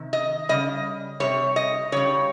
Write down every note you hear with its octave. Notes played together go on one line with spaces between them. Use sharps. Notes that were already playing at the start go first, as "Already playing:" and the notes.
Already playing: C3 D#3
D#5
C#3 G3 D#5
C3 G3 C#5
D#5
C#3 G3 C#5